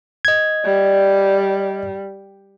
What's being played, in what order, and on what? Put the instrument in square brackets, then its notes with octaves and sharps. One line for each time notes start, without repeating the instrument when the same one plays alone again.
[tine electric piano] D#5 G#6
[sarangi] G3 [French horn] D5